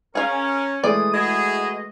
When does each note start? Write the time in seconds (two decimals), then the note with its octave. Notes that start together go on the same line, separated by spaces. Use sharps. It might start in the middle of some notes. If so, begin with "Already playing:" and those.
0.15 C#4 G#4 A#4 F5
0.84 E3 G#3 A3 D5 D#6
1.14 E4 F#4 G#4 D#5